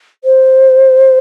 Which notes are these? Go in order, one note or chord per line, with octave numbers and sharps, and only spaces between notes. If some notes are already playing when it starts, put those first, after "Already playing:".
C5